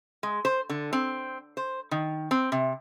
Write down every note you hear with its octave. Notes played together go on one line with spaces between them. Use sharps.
G#3
C5
D3
C4
C5
D#3
C4
C3